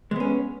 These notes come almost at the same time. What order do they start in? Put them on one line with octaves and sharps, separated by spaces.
G#3 B3 C#4